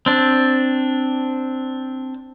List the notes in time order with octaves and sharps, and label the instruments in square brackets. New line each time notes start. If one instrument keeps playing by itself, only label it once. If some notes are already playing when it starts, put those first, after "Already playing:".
[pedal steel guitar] C4 D4